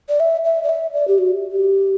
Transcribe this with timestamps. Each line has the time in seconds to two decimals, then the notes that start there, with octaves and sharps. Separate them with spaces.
0.09 D5
0.20 E5
0.45 E5
0.64 D5
0.69 E5
0.94 D5
1.08 G4
1.18 F#4
1.51 G4